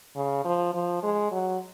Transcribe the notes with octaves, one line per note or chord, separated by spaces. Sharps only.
C#3
F3
F3
G#3
F#3